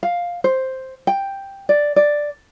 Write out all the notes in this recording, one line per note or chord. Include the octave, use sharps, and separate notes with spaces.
F5
C5
G5
D5
D5